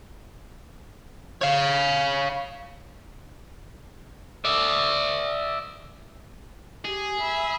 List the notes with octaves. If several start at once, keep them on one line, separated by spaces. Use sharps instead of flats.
C#5 F5
D5 E5
G4 G#4
E5 B5